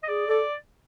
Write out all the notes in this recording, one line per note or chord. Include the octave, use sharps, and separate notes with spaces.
D#5
G#4 D5
A4 D5